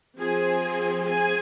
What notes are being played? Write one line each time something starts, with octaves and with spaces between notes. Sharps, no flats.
F3 C4 G#4 G#5
G#4 G#5